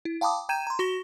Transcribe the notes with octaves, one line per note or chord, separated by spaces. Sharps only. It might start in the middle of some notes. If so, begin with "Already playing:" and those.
E4
F5 G5 A5 B5 D6 D#6
G5 A#5 G6 G#6 D#7 E7
A#5 C6
F#4 C#6 A#6 G7